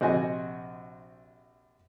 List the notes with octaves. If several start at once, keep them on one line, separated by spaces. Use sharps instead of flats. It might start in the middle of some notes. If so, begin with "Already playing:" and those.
A#1 C3 F#4 C5 D#5 G#5